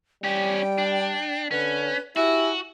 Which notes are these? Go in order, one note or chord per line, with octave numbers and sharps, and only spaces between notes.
G3 C#4 G4 G5
D4
D3 C#4 B4
E4 F#4 G4 G#5